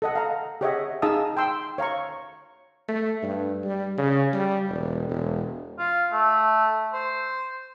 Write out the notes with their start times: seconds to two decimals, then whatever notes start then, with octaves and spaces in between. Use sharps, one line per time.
0.02 A4 D#5 F#5
0.15 F5 A#5
0.61 G4 G#4 C#5 D#5 E5 F#5
1.02 D#4 G#4 F5 A5 D#6 E6
1.37 G5 C6 E6
1.78 C#5 F5 A#5 C#6
2.89 A3
3.23 G2
3.64 G3
3.98 C#3
4.33 G3
4.68 E1
5.08 E1
5.79 F4
6.12 A3
6.93 C5